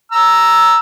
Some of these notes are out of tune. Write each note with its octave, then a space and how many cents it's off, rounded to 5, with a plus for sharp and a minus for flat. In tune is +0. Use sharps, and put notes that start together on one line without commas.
A#5 +0 E6 +0